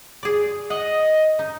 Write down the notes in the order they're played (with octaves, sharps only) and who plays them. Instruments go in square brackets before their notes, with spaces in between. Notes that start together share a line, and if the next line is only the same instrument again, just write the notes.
[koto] G#4 D5
[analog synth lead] D#5 [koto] F#5
[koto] D#4